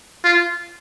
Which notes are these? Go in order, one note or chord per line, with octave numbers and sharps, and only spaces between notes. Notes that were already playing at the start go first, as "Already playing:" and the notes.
F4